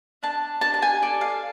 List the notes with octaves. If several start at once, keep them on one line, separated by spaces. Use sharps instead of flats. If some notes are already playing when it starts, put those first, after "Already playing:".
D4 A5
D4 A5
A5
G#5
A4 D5
F5